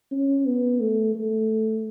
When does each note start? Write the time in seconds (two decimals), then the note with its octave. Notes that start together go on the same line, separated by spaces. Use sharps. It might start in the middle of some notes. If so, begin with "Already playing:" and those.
0.11 C#4
0.46 B3
0.80 A3
1.15 A3